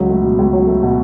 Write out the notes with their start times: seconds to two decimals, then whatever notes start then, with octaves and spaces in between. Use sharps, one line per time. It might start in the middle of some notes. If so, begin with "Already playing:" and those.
Already playing: C#2 F#3
0.09 A3
0.23 B2
0.39 C#2
0.53 F#3
0.67 A3
0.83 B2